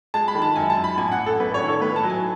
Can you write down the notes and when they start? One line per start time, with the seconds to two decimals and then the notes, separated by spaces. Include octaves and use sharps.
0.14 G#3 A5
0.28 B5
0.35 D#3
0.42 A5
0.56 F#2 G#5
0.70 A5
0.77 F#2
0.84 B5
0.97 A1 G#5
1.12 F#5
1.18 A1
1.26 A4
1.40 A1 B4
1.54 C#5
1.61 D#3
1.68 A4
1.81 A2 B4
1.96 A5
2.03 F#3
2.10 G#5